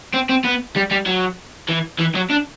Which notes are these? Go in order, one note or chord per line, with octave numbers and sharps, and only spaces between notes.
C4
C4
B3
G3
G3
F#3
E3
E3
F#3
D4